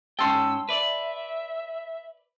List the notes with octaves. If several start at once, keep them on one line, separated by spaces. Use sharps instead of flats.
G#2 C#4 G5 A5 C6 E6
B4 D5 E5